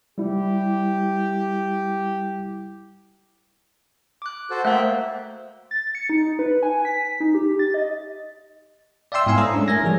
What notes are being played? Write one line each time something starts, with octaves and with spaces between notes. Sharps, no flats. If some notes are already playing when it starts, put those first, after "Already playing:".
G3 E4 G4
D6 F#6
F#4 A4 C5
A3 A#3 C5 E5 F#5 G5
A6
C#7
D#4
D#4
B4
G#5
B6
D#4
G4
A6
D#5
D5 E5 F5 G5 C6 E6
G#2 B3 E4 F5 G#5 C6
A4 C5 C#5 A#5 D#6 E6
G#3 A3 C#4 D4 E4
A#4 C#5 E5 G#5 G#6 A#6
E3 F3 G3 G#4